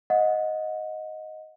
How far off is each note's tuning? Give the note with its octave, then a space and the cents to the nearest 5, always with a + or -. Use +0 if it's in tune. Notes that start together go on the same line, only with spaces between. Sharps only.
D#5 +5 F#5 -25